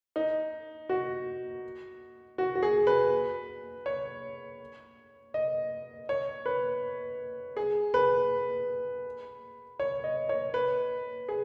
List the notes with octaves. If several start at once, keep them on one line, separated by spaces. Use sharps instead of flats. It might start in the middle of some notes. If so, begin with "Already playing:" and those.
D#4
F#4
F#4
F#4
G#4
B4
C#5
D#5
C#5
B4
G#4
B4
C#5
D#5
C#5
B4
G#4